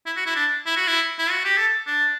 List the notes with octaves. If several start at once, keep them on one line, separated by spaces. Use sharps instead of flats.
E4
F#4
E4
D4
E4
F#4
E4
E4
F#4
G4
A4
D4